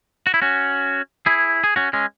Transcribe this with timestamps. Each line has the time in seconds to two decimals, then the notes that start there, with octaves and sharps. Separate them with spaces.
0.27 F#4
0.34 E4
0.42 C#4 F#4
1.26 E4 G#4
1.64 G#4
1.76 C#4 F#4
1.93 G#3 C#4